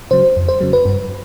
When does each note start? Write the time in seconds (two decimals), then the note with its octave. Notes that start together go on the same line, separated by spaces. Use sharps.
0.11 C#3 F#3 C5
0.36 F2
0.48 C5
0.61 C#3 F#3
0.73 B4
0.85 G2